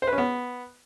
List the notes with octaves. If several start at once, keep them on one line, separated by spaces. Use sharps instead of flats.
C5
B4
C#4
B3